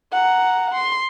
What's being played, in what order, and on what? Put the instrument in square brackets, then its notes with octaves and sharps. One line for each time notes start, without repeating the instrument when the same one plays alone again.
[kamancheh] F#5 A#5
C6